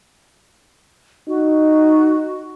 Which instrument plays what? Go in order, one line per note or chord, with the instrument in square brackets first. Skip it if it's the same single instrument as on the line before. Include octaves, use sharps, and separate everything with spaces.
[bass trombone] D#4 [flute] F#4